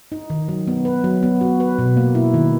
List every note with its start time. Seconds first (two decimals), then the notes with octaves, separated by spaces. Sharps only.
0.12 D#4
0.30 D#3
0.48 F#3
0.67 B3
0.85 B4
1.04 F#3
1.23 B3
1.41 F#4
1.60 B4
1.79 B2
1.97 A#3
2.15 E4
2.34 D#3